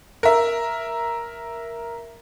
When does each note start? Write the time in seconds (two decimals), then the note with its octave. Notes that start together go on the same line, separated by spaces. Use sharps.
0.23 A#4 E5